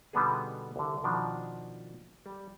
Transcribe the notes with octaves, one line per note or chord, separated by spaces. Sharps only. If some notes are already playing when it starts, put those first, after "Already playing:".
B2 D3 G3 B3 D#4 G#4
C2 D3
B2 D#3 F3 D4
G3